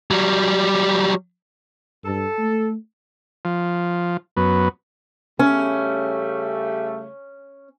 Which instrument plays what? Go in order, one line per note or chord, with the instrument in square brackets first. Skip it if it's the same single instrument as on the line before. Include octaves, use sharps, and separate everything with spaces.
[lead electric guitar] F#3 G3
[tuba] G2 [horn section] A4
[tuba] A3
[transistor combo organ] F3
F#2 B3
[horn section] C#3 G3 A3 [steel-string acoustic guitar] C#4